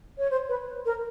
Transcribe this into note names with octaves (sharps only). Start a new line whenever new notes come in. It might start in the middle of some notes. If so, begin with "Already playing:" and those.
C#5
C5
B4
A#4